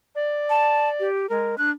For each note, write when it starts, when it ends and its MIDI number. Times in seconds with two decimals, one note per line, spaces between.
0.15 1.08 74
0.50 0.89 81
1.00 1.29 67
1.29 1.58 56
1.29 1.55 70
1.58 1.71 62
1.58 1.70 90